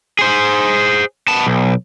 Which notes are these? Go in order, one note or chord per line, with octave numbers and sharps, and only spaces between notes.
G#4 C5
B3 A5
B1